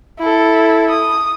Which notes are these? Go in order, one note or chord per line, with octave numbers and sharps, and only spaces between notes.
E4 A4
D#6